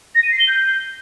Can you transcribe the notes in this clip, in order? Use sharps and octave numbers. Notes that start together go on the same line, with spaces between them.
A#6
D#7
C7
G7
G6